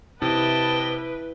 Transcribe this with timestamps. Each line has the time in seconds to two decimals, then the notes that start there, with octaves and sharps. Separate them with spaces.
0.22 C3 E4 B4 D#5 G5 A5